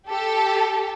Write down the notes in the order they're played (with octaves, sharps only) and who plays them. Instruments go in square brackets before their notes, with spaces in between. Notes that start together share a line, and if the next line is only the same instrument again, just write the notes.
[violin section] G4 A4